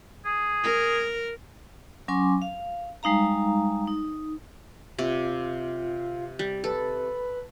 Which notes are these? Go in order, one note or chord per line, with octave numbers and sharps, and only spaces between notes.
G#4
A#4
F#3 C#4 G#5 C6 D6
F5
G3 G#3 D#4 F5 A#5
D#4
C3 F4 D5
G3
A4 B4